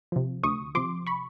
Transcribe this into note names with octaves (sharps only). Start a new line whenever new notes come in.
C3 F3
D2 C#6 D#6
C3 F3 C6 D6
B5 C#6